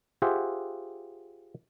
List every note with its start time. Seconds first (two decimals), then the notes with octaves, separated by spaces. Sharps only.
0.22 F4 G4 G#4 C5 E5 F#5